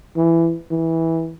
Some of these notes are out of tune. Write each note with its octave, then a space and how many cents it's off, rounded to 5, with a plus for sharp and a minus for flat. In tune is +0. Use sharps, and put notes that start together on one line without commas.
E3 +15
E3 -15